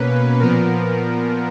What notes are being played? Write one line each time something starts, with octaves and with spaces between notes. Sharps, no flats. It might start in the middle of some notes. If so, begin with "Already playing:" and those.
Already playing: B2 A#3 C#4 B4
A#2 F3 B3 A#4